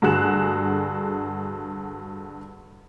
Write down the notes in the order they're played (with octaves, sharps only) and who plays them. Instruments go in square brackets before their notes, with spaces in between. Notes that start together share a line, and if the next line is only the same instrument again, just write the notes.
[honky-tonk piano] G2 D3 F#4 G#4 F#6 E7